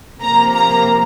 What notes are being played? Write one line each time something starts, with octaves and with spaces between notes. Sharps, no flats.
C3 F3 A#3 A#5
A#5